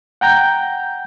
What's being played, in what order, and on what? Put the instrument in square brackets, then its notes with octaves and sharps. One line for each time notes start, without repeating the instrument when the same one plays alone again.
[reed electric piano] F#5 G5 A#5 G6